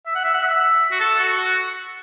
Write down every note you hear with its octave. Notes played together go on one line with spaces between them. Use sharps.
E5
F#5
E5
F#5
E5
F#4
A4
F#4
F#4